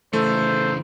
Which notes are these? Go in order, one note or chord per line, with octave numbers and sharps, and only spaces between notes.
C#3 E3 A3 A4 C5